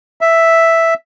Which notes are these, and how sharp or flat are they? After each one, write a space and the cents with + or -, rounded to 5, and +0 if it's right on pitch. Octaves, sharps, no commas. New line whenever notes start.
E5 +0